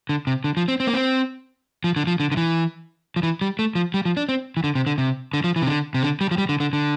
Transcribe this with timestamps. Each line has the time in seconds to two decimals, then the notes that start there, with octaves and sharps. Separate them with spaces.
0.09 D3
0.27 C3
0.44 D3
0.57 F3
0.68 C4
0.80 C4
0.87 A#3
0.94 C4
1.84 F3
1.96 D3
2.07 F3
2.20 D3
2.32 D3
2.37 E3
3.16 F3
3.23 E3
3.41 G3
3.59 A3
3.75 F3
3.94 G3
4.05 F3
4.17 D4
4.29 C4
4.57 E3
4.64 D3
4.75 C3
4.87 D3
4.98 C3
5.34 D3
5.44 F3
5.56 E3
5.62 C3
5.67 D3
5.94 C3
6.03 D3
6.21 G3
6.31 F3
6.38 G3
6.49 D3
6.60 D3
6.73 D3